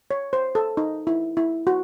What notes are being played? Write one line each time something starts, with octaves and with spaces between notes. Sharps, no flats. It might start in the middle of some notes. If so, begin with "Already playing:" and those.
C#5
C5
A4
D#4
E4
E4
F#4